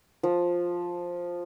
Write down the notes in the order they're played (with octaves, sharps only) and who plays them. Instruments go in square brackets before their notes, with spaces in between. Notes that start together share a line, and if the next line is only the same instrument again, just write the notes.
[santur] F3